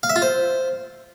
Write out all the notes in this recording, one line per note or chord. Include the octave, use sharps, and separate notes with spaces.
F5
E5
F4
C5